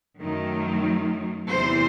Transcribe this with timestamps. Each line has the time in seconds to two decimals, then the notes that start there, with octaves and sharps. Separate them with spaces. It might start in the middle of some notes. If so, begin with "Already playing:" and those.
0.20 F#2 D#3 F#3 A3
1.48 E2 C3 E3 A3 C5